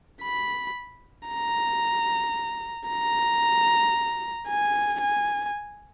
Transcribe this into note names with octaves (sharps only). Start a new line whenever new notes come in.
B5
A#5
A#5
G#5
G#5